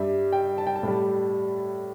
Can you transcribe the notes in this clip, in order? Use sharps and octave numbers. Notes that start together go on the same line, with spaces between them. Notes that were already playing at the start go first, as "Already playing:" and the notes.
Already playing: G2 G3 E5
G5
A5
G5
A5
A2 G3